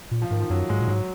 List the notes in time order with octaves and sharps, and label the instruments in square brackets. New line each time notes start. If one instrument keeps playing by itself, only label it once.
[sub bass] A#2
[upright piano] F3
[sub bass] G#2 [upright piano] D#3
[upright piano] F3
[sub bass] F#2 [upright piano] F#3
[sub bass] G#2 [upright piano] G#3
[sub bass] A#2
[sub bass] G#2 [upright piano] F#3